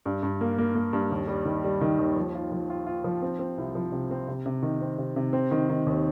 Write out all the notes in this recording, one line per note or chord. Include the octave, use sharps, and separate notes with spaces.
G2
G2
A#3
A#3
A#3
G2
D#2
G3
D#3
G3
D#3
D#2
F3
F4
F3
F4
F4
F3
C4
C4
C2
F3
C3
C4
C3
C3
D#3
C4
C3
C3
C4
D#3
D#3
D#2